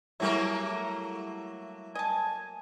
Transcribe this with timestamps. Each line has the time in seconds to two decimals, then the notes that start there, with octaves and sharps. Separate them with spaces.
0.20 F#3 G3 A3 A#3 E4 G#4 C#5 E5
1.95 D#5 G#5 A5